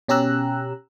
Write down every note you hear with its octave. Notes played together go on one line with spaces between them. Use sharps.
B2 C#4 G4 A#5 E6 F#6